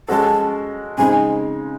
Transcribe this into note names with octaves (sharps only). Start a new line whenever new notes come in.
G#3 C#4 F#4 A4 A5
C#3 G#3 C4 D#4 G#5